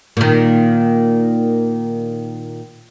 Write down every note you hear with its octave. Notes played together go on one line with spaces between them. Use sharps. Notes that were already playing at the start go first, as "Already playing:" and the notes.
A#2 D#3